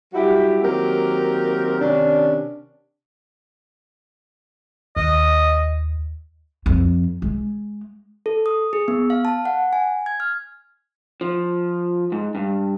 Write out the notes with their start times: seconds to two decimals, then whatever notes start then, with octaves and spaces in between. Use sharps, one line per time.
0.14 F#3 G3 E4 F#4 G4
0.63 D#3 F#3 A#3 C4 G4 A#4
1.81 C3 D#3 C#4 D4
4.97 D#2 D#5
6.66 F2
7.22 G#3
8.26 A4
8.46 D#6
8.73 G#4
8.88 B3
9.10 F5
9.25 A5
9.45 F#5
9.73 G#5
10.06 G#6
10.20 F6
11.21 F3
12.12 G#2
12.35 G2